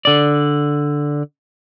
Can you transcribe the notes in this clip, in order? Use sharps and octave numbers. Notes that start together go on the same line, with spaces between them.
D3 D5